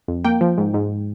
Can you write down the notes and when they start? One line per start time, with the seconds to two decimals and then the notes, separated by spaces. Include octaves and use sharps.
0.08 F2
0.24 A#3 G5
0.41 F3
0.58 G#2
0.74 G#2